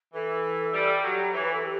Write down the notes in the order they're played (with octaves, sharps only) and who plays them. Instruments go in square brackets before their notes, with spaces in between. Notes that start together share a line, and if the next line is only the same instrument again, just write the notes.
[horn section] E3 [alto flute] A4
[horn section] G3
[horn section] F#3 [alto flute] G4
[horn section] E3 [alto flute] C#5
[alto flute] B4
A4
G4